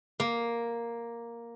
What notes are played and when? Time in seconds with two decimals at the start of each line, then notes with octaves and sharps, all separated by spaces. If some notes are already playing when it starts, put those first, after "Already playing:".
0.20 A#3